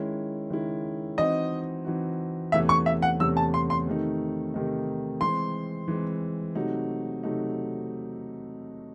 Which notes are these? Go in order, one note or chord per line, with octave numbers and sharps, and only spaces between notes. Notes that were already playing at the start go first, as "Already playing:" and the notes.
Already playing: D#3 G#3 C#4 E4
D#3 G#3 C#4 E4
E3 C4 D#4 F#4 D#5
E3 C4 D#4 F#4
E2 C3 E3 A3 C#4 E5
C#6
E5
F#5
E2 C3 E3 A3 C#4 E6
A5
C6
C6
C3 D#3 A3 D#4
C3 D#3 A3 D#4
E3 G#3 C4 C6
E3 G#3 C4
C3 F#3 A3 D#4 F#4
C3 F#3 A3 D#4 F#4